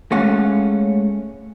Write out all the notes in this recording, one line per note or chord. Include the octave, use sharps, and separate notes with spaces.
G#3 A3 C#4 F5 F#5